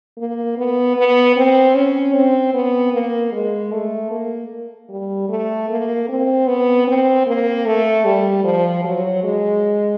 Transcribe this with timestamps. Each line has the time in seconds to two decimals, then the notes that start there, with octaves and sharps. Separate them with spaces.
0.18 A#3
0.57 B3
0.96 B3
1.36 C4
1.75 C#4
2.14 C4
2.53 B3
2.93 A#3
3.32 G#3
3.71 A3
4.11 A#3
4.90 G3
5.29 A3
5.69 A#3
6.08 C4
6.47 B3
6.87 C4
7.27 A#3
7.66 A3
8.05 G3
8.44 F3
8.84 F#3
9.24 G#3